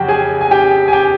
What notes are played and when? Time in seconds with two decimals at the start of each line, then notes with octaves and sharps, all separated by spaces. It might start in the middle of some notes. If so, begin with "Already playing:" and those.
Already playing: F2 C#3 F#3 F#4 G4 G5
0.08 G#4 G#5
0.41 G#5
0.51 G4 G5
0.88 G#5
0.93 G4 G5